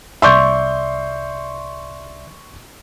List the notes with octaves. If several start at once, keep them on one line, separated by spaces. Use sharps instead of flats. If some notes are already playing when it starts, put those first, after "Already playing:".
C2 D5 E5 C6 C#6 G6